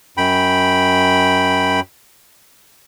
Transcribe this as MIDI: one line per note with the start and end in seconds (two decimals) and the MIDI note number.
0.17 1.80 42
0.17 1.80 79
0.17 1.80 83